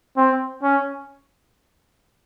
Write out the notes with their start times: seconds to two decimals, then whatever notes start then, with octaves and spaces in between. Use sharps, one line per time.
0.17 C4
0.63 C#4